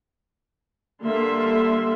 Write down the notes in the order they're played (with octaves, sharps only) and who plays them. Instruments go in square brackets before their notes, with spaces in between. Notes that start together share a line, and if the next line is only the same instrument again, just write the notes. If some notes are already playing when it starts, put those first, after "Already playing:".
[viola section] D3 G3 A#3 E5 C6